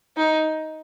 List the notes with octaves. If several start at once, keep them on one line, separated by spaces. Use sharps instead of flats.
D#4